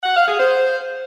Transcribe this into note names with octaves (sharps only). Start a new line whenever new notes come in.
F#5
F5
G#4
C5